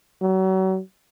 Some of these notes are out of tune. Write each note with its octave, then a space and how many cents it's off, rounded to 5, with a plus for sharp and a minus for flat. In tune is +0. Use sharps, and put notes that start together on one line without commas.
F#3 +35